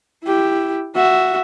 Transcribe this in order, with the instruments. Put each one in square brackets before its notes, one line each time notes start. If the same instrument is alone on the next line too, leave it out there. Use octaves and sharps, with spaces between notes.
[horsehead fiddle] E4 G4
F#4 E5